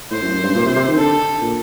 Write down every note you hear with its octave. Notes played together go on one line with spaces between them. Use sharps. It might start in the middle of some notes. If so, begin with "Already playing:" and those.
A2 C5
F#2
F#2
G2
A#2
C3
C3
D#3
D3 A4
D3
A#2